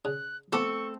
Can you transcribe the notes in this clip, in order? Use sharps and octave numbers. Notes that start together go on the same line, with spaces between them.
C#3 F#6
F3 A3 B3 C4 A4 C#6 D6